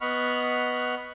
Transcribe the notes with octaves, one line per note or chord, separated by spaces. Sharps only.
B3 D#5 F#5 B5 C#6 F6